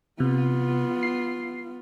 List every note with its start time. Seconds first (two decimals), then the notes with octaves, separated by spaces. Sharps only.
0.20 C3 B3 F4
1.03 C7